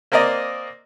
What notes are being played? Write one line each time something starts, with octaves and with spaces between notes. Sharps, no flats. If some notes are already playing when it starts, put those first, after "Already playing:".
A#3 C4 A#4 D5 D#5